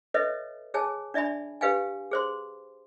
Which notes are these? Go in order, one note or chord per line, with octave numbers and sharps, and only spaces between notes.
A4 B4 C#5 D#5 E5
G#4 C#5 G#5 A5
D4 D5 E5 G#5 B5
G4 B4 F5 G5 G#5
G#4 C5 C6